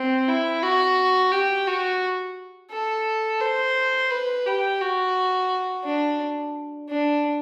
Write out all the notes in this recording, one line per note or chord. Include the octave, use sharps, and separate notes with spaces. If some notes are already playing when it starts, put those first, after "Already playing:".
Already playing: C4
E4
F#4
G4
F#4
A4
C5
B4
G4
F#4
D4
D4